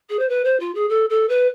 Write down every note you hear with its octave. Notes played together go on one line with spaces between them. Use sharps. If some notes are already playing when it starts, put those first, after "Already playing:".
G#4
C5
B4
C5
F4
G#4
A4
A4
B4